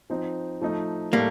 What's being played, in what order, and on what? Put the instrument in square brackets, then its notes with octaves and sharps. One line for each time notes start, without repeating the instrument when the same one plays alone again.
[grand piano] F3 C4 D#4
F3 A3 D#4
[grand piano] A2 A3 [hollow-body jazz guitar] G3 A#3